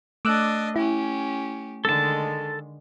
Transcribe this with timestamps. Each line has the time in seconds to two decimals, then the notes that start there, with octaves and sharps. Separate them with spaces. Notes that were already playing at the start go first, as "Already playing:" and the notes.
0.25 A3 D4 D#5 D6 E6 F#6
0.76 C#4 E4 G4
1.85 D3 D#3 G#3 A4 A5